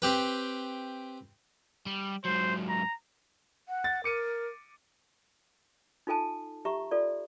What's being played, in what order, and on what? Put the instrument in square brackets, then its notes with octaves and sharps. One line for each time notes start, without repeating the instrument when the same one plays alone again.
[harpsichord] C4 G4 B4
[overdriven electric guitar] G3
[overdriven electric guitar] G#2 F#3 [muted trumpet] C5
[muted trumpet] A#5
[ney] F#5
[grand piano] A6
[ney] A#4 [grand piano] D6 C#7 D#7
[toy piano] D#4 F4 A4 G#5 A5
G4 E5 A#5 C#6
F4 A4 D5